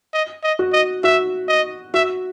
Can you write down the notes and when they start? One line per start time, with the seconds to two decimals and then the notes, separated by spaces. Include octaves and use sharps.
0.14 D#5
0.44 D#5
0.59 F#4
0.73 D#5
1.04 F#4 E5
1.48 D#5
1.94 F#4 E5